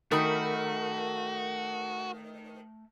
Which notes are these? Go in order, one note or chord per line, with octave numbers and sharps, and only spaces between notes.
D#3 A3 F#4 A#4 G5 B5